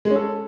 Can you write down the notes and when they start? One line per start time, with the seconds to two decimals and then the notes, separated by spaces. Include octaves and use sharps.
0.05 G#3
0.10 C#4
0.16 A4